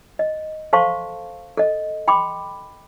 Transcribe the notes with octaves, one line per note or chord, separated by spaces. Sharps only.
D#5
A4 C5 F5 A5 C6 C#6
A4 D#5
G5 B5 C6 D6